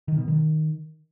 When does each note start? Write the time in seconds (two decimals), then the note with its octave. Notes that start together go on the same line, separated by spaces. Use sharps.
0.08 D#3
0.18 B2
0.28 D#3